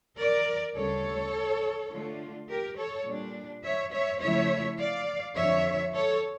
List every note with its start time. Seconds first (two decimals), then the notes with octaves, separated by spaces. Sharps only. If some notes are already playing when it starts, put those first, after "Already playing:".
0.18 A#4 D5
0.75 D2 C#3 G3 A4 C#5
1.91 D3 A3 D4 F4
2.48 G4 A#4
2.77 A4 C#5
3.06 A#2 G3 D4
3.64 C#5 E5
3.92 C#5 E5
4.21 C#3 F3 A3 E4 C#5 E5
4.79 D5 F5
5.36 F2 D3 F3 C#5 E5
5.94 A4 C#5